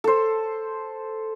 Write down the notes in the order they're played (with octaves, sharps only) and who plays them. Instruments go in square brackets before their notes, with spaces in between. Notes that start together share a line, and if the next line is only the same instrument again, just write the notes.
[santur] A4 C5